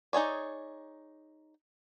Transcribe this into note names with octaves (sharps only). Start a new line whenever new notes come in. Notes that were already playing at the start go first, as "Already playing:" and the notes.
D#4 G#4 C#5 D5